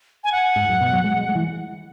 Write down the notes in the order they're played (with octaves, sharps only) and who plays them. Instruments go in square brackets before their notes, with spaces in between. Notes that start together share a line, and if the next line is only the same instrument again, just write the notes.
[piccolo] G#5
F#5
[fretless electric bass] G#2
F#2
B2
F#3
G#3
G#3
G#3
E3